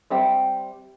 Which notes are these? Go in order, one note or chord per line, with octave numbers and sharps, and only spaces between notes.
G3 C4 E5 G5